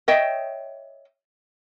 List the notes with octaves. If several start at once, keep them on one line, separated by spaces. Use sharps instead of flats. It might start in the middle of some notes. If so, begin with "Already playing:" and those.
C#5 D#5 E5 G5